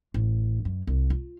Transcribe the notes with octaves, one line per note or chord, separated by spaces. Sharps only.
A1
F#2
C2
F4